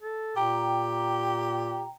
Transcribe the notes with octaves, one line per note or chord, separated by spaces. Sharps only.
A4
A#2 G4 G5 A#5